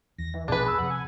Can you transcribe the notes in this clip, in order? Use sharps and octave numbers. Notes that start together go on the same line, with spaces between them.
E2 A#6
E3
A#1 F2 B2 D4 G#4 B4
B5 E6
F2 C3 F#5
G#5